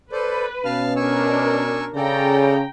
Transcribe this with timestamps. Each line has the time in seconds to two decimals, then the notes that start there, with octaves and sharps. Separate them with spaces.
0.12 A4 B4 C5 D5
0.65 B2 C#4 F5 A5 F6
0.96 D4 A#4 G#5 C#6 E6
1.96 C#3 A4 D5 G5 A#5